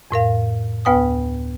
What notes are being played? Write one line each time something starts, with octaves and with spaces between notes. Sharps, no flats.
F2 A2 A#4 F5
D2 B3 B4 G5 G#5 D#6